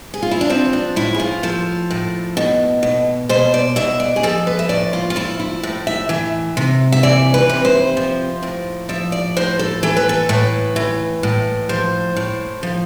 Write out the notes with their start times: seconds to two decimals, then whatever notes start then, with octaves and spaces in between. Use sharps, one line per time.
0.14 G#4
0.22 F4
0.31 E4
0.41 D4
0.50 F3 C4
0.73 D4
0.96 A2 E4
1.15 G#4
1.20 F4
1.43 F3 A4
1.91 A2
2.37 B2
2.83 B2
3.29 B2 C5
3.54 D5
3.76 B2 E5
4.00 D5
4.16 G#4
4.23 F3 A4
4.47 B4
4.59 E5
4.69 A2 D5
4.93 F4
5.10 F4
5.16 F3 E4
5.40 E4
5.63 A2
5.87 E5
6.09 E3 E5
6.57 C3
6.92 E5
7.03 E3 D5
7.34 B4
7.49 C3
7.65 C5
7.97 F3
8.43 A2
8.89 F3 E5
9.12 D5
9.37 A2 C5
9.59 A4
9.83 E3 A4
9.96 B4
10.09 A4
10.29 A2 B4
10.76 E3
11.23 A2
11.69 F3 C5
12.16 A2
12.63 F3